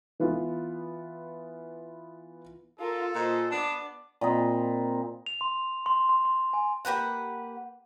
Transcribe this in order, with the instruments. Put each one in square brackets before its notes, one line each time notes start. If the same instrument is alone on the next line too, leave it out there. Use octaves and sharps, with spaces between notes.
[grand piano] E3 B3 F4
[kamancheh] F4 A#4 [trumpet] A4
[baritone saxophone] A#2 [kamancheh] C5 D#5
[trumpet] B3 [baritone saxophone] D4 [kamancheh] D5 D6
[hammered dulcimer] A#2 C4 D#5 B5
[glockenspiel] F7
C6
C6
C6
C6
G#5
[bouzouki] A#3 G4 B4 F#5